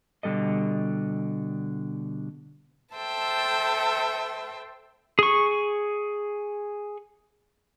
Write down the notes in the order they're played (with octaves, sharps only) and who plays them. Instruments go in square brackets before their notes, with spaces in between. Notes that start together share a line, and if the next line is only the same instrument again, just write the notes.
[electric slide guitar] B2 D3 G3 A4 D#5
[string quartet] A4 C5 E5 G5 A5
[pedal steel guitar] G#4 C#6